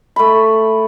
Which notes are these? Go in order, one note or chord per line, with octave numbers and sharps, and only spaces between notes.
A3 B5